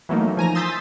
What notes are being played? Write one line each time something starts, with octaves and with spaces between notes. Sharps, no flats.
E3 F#3 A3 A#3 D#4
F3 G#5 A#5 A#6
C6 D#6 E6 G6 A6 B6